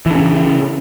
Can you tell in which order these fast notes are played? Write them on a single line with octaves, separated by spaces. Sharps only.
E3 D4 C#4 C#3